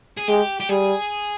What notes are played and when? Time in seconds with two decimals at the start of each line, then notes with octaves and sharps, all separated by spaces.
0.18 G#4
0.28 G#3 G4
0.60 G4
0.69 G3 G#4